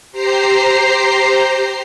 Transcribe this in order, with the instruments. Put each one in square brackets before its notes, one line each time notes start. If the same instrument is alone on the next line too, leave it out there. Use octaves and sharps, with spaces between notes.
[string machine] G4 C5 A#5 C7